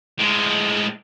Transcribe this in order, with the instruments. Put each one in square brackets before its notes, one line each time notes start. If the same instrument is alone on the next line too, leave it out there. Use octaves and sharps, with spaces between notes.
[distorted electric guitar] A2 G#3